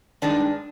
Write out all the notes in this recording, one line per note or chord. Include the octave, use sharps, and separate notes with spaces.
G2 D#3 G#3 D4